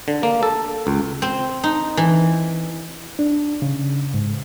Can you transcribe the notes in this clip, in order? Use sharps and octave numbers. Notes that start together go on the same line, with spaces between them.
D3
A#3
A4
C#2
C4
D#4
E3
D4
C#3
G#2